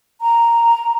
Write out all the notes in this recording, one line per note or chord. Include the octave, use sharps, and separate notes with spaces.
A#5